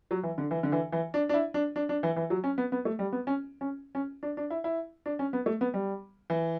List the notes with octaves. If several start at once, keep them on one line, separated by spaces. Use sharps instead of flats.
F#3
E3
D3
E3
D3
E3
E3
D4
D4
E4
D4
D4
D4
E3
E3
F#3
C#4
B3
B3
A3
G3
B3
C#4
C#4
C#4
D4
D4
E4
E4
D4
C#4
B3
A3
B3
G3
E3